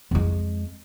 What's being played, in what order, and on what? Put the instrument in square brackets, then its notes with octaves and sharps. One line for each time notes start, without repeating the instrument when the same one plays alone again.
[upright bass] F2 G#3